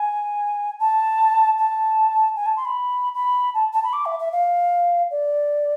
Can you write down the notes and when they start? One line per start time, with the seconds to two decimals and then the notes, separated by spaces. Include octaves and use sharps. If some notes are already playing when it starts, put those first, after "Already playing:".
Already playing: G#5
0.80 A5
1.58 A5
2.36 G#5
2.46 A5
2.57 C6
2.65 B5
3.15 B5
3.54 A5
3.73 A5
3.83 B5
3.93 D6
4.05 E5
4.19 E5
4.32 F5
5.11 D5